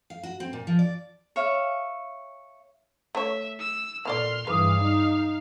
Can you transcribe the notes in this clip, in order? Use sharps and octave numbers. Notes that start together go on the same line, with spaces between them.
F5
F#4
C4
A#2
F3
D5
C#5 E5 F5
A3 C#5 E5
E6
A#2 B3 A4 D5 C6 F6
G2 E3 G#4 B4 F5 D6 D#6
D#4